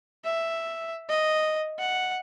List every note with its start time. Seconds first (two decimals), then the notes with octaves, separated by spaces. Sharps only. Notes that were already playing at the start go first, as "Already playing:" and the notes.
0.25 E5
1.09 D#5
1.79 F#5